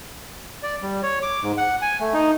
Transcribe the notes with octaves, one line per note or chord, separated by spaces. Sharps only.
D5
G3
C#5
D6
G#2
F#5
G#5
A3
D#4